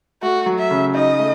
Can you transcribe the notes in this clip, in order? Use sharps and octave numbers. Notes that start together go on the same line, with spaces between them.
A3 F#4
F#3
E5
C#3
D#4 D#5
A3